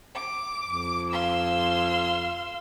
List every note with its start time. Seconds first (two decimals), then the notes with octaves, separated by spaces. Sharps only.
0.14 D6
0.64 F2
1.10 F5 C6 E6